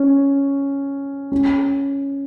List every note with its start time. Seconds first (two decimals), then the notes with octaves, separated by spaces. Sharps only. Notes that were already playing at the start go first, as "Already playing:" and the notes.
Already playing: C#4
1.32 C#4